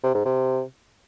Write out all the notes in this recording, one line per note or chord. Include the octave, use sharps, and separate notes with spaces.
C3
G#2
C3